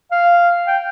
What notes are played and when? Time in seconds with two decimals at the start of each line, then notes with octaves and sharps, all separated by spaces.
0.12 F5
0.67 G5